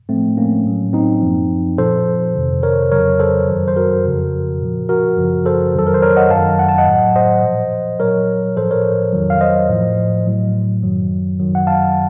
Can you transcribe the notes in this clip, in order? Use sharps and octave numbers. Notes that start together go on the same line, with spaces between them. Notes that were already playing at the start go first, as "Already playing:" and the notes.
A2 F3 A3 C4
A#3 C#4
A2 F#3
C4 D#4
F#2 F3
A#2 F3 A4 C5
F2 C3 D#3
A#4 C#5
F2 C#3 F#3 A#4 C#5
A4 C5
F#2 D#3 F#3
C5
F#4 A#4
F2 C#3 F3
A#2 F3
F#4 A#4
F#2 C#3 F3
A4 C5
F2 D#3 F#3 A4
A#4
C5
A#4 C#5
D#5 F#5
F#2 D#3 F#3 F5 A5
F#5
A5
D#5 F#5
A2 F#3
C5 D#5
A#2 F3
A#2 F#3 A#4 C#5
A2 F3 A4 C5
A#4 C#5
F2 D#3 F#3
F5
C5 D#5
A2 F3
A2 F#3
F#2 D#3 F#3
F#2 D#3 F#3
F#5
F5 A5